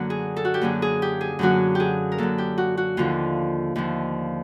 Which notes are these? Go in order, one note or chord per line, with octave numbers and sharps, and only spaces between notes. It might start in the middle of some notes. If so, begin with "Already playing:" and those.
Already playing: F#2 D3 F#3 A#3 F#4
G#4
A4
F#4
G4
F#2 D3 F#3 A#3 G#4
G#4
G4
G#4
F#2 D3 F#3 A#3 F#4
G4 G#4
A#4
F#2 D3 F#3 A#3 A4
G4
F#4
F#4
D#2 D3 F3 F4
D#2 D3 F3